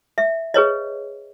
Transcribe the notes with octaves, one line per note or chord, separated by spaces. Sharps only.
E5
G#4 B4 C#5 D#5